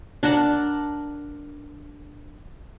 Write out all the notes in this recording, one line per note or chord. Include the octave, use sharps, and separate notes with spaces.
D4 A#4 F#5 A5